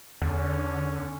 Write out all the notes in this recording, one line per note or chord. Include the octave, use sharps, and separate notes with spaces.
E2 D3 C#4